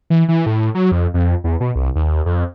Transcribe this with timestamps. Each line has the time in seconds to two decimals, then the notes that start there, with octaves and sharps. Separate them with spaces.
0.10 E3
0.28 E3
0.46 A2
0.75 F#3
0.92 F2
1.14 F2
1.44 E2
1.60 B2
1.75 C2
1.95 D#2
2.26 F2